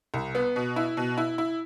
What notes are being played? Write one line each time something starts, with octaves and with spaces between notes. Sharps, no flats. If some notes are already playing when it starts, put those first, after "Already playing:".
C2
B3
B2
E4
B2
E4
E4